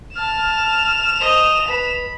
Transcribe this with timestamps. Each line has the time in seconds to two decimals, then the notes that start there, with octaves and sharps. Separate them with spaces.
0.16 A5 F6 E7 F7
1.20 C5 D#5
1.67 B4 B5